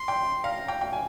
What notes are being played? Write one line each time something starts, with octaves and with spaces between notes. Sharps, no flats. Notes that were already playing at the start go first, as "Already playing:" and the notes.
Already playing: C6
G5
F5 A#5
G5
G5
G#5